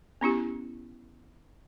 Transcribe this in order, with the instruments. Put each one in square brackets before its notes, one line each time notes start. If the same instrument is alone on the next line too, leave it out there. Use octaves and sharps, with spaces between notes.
[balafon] B3 C#4 E4 G4